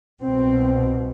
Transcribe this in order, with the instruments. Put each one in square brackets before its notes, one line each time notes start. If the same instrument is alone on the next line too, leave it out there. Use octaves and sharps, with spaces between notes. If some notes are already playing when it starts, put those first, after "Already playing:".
[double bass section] C2 B2 C4